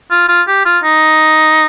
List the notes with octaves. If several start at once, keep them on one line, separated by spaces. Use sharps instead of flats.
F4
F4
G4
F4
D#4